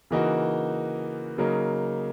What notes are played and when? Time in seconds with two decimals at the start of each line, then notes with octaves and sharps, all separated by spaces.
0.11 C#3 E3 A#3 D#4 F#4
1.38 C#3 F#3 A#3 D#4